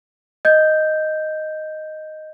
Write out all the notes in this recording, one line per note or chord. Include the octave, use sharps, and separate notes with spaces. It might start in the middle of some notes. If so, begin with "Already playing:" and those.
D#5 G6